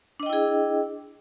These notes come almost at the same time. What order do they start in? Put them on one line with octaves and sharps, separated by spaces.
D4 D#5 G5 E4 G#4